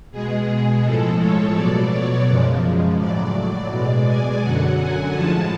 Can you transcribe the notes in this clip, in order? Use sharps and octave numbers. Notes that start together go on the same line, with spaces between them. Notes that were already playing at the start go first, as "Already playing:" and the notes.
B2 G#3 G#4
G#4
A2 F3 G#3 A4
C#5
B2 F#3 D5
C#5
F#2 C#3 F3 G#3
A2 F#3 D5
D5
B2 G#3 D5
G#5
F#2 D3 F#3 F#5
G#5
A2 F3 G#3 A5